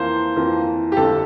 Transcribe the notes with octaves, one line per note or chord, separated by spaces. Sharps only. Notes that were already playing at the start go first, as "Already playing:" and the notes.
Already playing: F2 E3 A#3 F4 C5
F2 E3 A#3 F4
G4
G1 F2 D3 A4